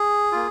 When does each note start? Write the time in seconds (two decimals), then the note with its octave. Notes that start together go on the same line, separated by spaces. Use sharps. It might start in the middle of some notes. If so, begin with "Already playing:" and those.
Already playing: G#4
0.32 A#3 F4